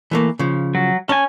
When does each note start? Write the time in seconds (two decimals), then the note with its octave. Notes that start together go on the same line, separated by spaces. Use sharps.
0.11 E3 A3 A#3
0.39 C#3 F3
0.75 F#3
1.09 C#4 G#5 A5